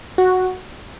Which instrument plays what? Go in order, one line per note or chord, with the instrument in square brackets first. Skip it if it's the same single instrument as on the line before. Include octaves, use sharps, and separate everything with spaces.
[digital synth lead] F#4